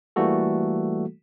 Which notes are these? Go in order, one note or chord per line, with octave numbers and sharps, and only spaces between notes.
E3 G3 A3 A#3 F#4 A4